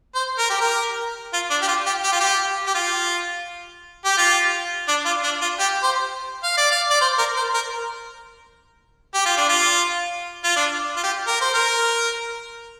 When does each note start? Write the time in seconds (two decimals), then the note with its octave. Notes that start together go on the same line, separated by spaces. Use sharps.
0.15 C5
0.39 A#4
0.50 G4
0.61 A#4
1.34 F4
1.51 D4
1.62 G4
1.68 F4
1.86 G4
2.04 G4
2.12 F4
2.20 G4
2.67 G4
2.75 F4
4.05 G4
4.18 F4
4.88 D4
5.06 F4
5.24 D4
5.42 F4
5.60 G4
5.83 C5
6.44 F5
6.58 D5
6.71 F5
6.91 D5
7.02 C5
7.18 A#4
7.37 C5
7.54 A#4
9.14 G4
9.26 F4
9.37 D4
9.49 F4
10.44 F4
10.56 D4
10.97 F4
11.04 G4
11.27 A#4
11.41 C5
11.54 A#4